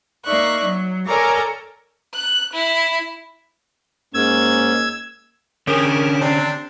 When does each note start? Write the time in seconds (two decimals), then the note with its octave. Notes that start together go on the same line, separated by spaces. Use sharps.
0.24 A#3 D#4 D5 E5 C#6 F#6
0.63 F#3
1.06 A4 A#4 C#5 D5 G#5 A#5
2.14 F#6
2.53 E4
4.14 G#2 A#3 C#4 E6 G#6
5.67 D3 C#4 G4 G#4 A#4
6.21 C3 C4 D4